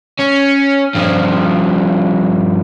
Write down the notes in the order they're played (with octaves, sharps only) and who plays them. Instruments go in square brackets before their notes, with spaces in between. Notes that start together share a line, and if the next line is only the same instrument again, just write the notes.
[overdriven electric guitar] C#4
G2 F3